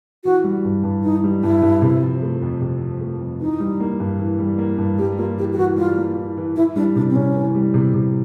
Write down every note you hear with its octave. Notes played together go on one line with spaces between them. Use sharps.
E3 F#4
G3
G2
G2
E3 D#4
G3
G2 E4
G2
C3
F3
A3
F2
C3
F3
A3
F2
E3 D#4
G3
A#3
G2
E3
G3
A#3
G2
G3 G4
A#3 F4
E3 G4
G4
E3 F#4
G3 F4
A#3
E3
E3
E3 E4
G3 D4
C3 D4
C4
C3 C#4
E3
G3
C3
C3